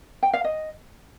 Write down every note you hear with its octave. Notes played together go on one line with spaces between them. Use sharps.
G5
F5
D#5